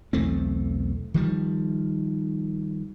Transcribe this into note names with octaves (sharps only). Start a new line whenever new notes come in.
B1 E2 A3 C4
D#3 F3 G3